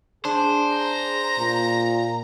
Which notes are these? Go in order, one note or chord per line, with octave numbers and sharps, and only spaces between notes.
D4 G#4 C5
A#5
A#2